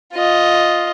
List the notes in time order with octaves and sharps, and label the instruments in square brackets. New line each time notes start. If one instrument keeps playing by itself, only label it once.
[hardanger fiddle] F4 D#5